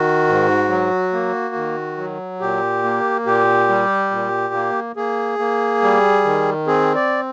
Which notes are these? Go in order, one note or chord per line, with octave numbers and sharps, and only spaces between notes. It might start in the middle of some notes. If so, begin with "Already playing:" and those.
Already playing: D#3 F#4
G#2
F#3
A#3
D#3
F#3
A#2 G4
A#3
A#2 G4
G3
A#2
A#3
A#3 G#4
A#3
G3
D#3
C4 G#4
D5